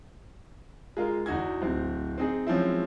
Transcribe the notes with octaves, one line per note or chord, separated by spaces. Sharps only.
G#3 F4 A#4
E2 E3 D#4 F#4 G#6
D1 C4
C4 D#4 G#4
F3 F#3 G#3 C4 C#4 E4